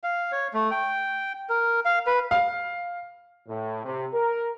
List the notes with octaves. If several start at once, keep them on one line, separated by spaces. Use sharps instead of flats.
F5
C#5
A3
G5
A#4
F5
B4
F5
A2
C3
A#4